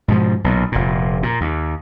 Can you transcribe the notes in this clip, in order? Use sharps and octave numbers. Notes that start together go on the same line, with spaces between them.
G#2 B2 F3
B1 A#2
F1 A#2
A#2
D#2